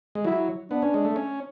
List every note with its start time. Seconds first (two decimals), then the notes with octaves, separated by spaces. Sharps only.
0.15 G#3
0.25 F#3 E4
0.71 B3 D4
0.82 C#4
0.94 G#3
1.05 A3
1.16 C#4